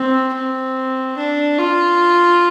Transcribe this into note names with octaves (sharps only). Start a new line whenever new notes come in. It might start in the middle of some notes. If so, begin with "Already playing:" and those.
Already playing: C4
C4
D4
F4